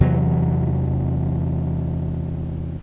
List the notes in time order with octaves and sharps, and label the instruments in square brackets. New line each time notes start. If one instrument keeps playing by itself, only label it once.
[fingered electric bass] E2 C3 E3 F#3